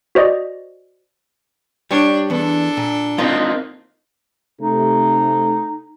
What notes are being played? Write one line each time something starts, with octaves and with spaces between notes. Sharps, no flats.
F#4 C5 D5 D#5
G3 D4 C#5
E2 B3 D4 A4
A#2
A#3 C4 D#4 F4 D#5
C3 A3 D#4 A4